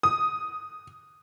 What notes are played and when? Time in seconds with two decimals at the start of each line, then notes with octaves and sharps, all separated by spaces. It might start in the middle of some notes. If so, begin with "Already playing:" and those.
0.03 D#6